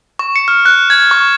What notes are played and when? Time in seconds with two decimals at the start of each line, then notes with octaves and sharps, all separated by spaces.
0.19 C#6
0.36 C#7
0.48 F6
0.65 F#6
0.90 G#6
1.11 C#6